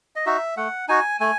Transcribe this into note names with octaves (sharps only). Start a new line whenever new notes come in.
D#5
D#4 F#4 E5
A3 F#5
D#4 F#4 G#5
A3 G#5